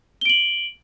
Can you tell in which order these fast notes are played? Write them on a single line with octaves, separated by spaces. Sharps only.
G7 D7 F#7